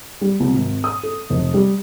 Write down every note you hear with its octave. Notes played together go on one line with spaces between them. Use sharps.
G3
C2
G#1
D#6
A4
F1
G3